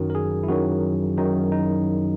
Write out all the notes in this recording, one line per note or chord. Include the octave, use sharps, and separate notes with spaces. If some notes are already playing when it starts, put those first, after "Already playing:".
Already playing: F#2 D#3 F#3 F#4
A#4
G#4
E4
F#2 D#3 F#3 F#4
F#2 D#3 F#3 D#4
D#4